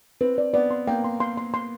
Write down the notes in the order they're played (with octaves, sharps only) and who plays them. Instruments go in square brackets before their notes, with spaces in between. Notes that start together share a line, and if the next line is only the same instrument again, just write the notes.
[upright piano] C4 [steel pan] B4
[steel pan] D5
[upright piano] B3 [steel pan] D5
[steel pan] C6
[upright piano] A#3 [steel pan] G5
[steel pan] C6
C6
C6
C6